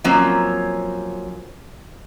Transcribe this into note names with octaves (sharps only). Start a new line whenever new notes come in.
F3 F#3 A#3 C4 C#4